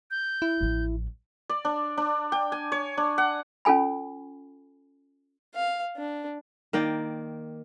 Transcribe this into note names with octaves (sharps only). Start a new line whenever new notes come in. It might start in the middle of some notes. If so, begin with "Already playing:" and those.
G6
E4
A1 F3
D5
D4
D4
G5
G#5
C#5
D4
F#5
C#4 F4 A4 G#5 B5
F5
D4
D#3 A#3 D5 G5